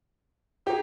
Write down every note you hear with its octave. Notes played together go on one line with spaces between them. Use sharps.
D#4 G4 G#4